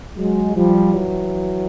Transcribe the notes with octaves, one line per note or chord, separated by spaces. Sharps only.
F#3 G#3
F3 G3
E3 F#3